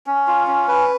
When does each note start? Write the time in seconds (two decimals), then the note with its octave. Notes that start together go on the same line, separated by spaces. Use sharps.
0.07 C#4
0.27 F4
0.47 C#4
0.68 B4